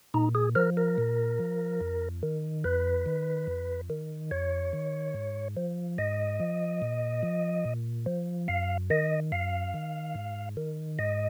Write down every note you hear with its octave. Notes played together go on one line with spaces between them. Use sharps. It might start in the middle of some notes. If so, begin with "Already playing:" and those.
A#2 D#4
G#4
F3 A#4
A#4
A#2
F3
F2
D#3
F2 B4
D#3
F2
D#3
F2 C#5
D#3
G#2
F3
G#2 D#5
F3
A#2
F3
A#2
F3
F#2 F5
D#3 D#5
F#2 F5
D#3
G#2
D#3
G#2 D#5